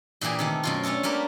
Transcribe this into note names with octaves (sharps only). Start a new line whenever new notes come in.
A#2 E3 A#3 G4 G#4
C3 D#3 A3
F#2 B2 F4
A3 C#4 D4 F4 A4
G3 A#3 G4 A#4 B4